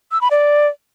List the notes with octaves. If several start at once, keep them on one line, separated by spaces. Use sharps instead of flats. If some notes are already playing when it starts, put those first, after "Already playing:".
E6
B5
D5